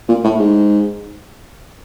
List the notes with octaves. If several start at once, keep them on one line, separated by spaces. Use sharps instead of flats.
A#2
A2
G#2